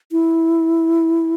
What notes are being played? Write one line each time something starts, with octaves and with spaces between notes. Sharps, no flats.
E4